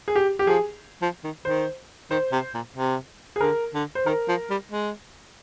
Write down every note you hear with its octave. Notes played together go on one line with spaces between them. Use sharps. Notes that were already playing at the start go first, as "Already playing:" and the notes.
G#4
G4
G4
F3 G#4
F3
D#3
D#3 C5
D#3 C5
C3
A#2
C3
G#4
D3 A#4
D3
C5
D#3 A#4
F3
G3
G#3